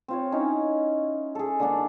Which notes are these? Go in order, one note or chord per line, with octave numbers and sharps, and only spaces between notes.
C4 F4 C#5
C#4 D#4 E4
G#4 A4
D3 A#3 D4 F#5